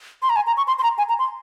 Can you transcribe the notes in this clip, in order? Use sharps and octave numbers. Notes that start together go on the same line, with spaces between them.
C6
A#5
G#5
A#5
C#6
C6
C6
A#5
G#5
A#5
C6